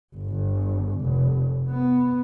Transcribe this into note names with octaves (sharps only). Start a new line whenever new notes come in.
G1
F1
B3